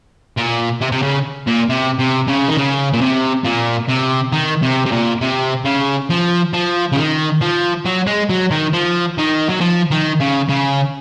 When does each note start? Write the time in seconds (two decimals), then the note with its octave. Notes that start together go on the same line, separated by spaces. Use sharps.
0.37 A#2
0.81 C3
0.92 C3
1.02 C#3
1.47 A#2
1.69 C3
1.99 C3
2.27 C#3
2.48 D#3
2.57 C#3
2.93 A#2
3.01 C3
3.45 A#2
3.89 C3
4.33 D#3
4.62 C3
4.86 C3
4.92 A#2
5.21 C3
5.65 C#3
6.10 F3
6.53 F3
6.92 C#3
6.97 D#3
7.42 F3
7.85 F#3
8.07 G#3
8.30 F#3
8.51 D#3
8.73 F3
9.18 D#3
9.50 F#3
9.61 F3
9.91 D#3
10.20 C#3
10.49 C#3